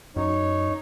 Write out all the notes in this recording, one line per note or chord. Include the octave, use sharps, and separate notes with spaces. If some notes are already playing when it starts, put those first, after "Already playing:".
F#2 D#4 C#5